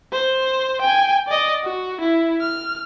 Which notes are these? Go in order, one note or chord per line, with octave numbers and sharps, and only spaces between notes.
C5
G5 G#5
D5 D#5
F#4
E4
F6